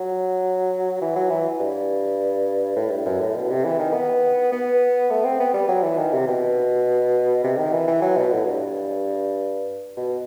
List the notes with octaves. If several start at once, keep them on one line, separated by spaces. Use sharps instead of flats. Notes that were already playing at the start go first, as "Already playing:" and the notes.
Already playing: F#3
E3
F#3
E3
G2
A2
G2
F#2
A2
B2
C3
E3
D#3
B3
B3
A3
C4
B3
G3
F#3
E3
D#3
C3
B2
C3
D#3
E3
E3
F#3
B2
A2
G2
B2